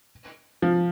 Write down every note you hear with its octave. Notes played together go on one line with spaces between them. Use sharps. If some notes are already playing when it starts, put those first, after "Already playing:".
F3